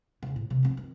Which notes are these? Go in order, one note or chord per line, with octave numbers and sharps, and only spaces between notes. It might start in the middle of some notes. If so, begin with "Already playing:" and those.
E1 C#3
A2
C3 D#3
F3 C4
D#3